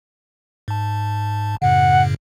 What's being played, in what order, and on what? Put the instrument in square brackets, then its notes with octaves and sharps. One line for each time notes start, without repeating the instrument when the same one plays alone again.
[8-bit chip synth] G#2 A5
[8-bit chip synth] F#2 A2 C#3 [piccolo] F#5